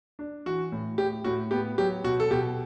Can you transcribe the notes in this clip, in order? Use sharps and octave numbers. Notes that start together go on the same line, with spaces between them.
D4
E3 F#4
A2
A2 G4
A2 F#4
B3 G4
F#3 G4
B2 F#4
A4
B2 G4